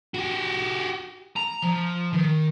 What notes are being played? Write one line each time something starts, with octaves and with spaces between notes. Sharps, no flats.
F#4 G4
A#5
F3
D#3